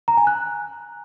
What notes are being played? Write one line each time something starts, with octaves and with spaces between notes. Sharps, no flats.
A#5
G#5
F#6